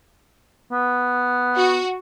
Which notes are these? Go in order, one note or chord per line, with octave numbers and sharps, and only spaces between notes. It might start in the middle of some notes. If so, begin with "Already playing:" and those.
B3
F#4